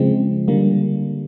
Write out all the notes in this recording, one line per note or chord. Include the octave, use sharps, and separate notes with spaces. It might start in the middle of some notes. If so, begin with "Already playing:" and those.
Already playing: C#3 F3 G#3 C4
D3 G3 A#3